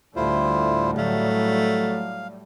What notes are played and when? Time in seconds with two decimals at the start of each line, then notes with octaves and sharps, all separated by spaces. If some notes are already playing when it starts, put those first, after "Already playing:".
0.16 D2 A2 G3 E4 F4 C5
0.97 F#3 A3 F5